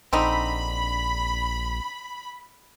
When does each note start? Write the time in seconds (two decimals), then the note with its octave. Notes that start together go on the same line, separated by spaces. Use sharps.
0.13 A#1 D3 C4 D#4 B5